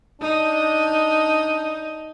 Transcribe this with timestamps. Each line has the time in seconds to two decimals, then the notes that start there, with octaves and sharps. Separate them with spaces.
0.21 D4 D#4